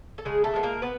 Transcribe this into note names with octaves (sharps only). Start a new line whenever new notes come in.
A4
C#3 G#3 G#4
A3 A4
F3 G#3 B3
A#3 A#4
B3 B4